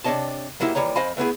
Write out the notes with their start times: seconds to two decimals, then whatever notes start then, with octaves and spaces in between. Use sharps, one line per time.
0.04 C3 D4 B4 C#5 D#5 A5
0.60 G#2 F#3 A#3 E4 G4
0.75 D#2 E3 G3 C#5 A#5
0.96 F2 C5 D#5 F5 G#5 B5
1.17 A3 B3 E4 G#4